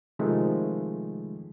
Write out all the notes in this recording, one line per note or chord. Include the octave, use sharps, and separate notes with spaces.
C3 D#3 F3 G#3 A3